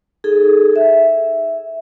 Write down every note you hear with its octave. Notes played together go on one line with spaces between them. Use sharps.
D#4 G#4 A4
E5